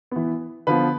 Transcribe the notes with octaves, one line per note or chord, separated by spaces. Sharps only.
E3 B3
D3 F3 B3 B4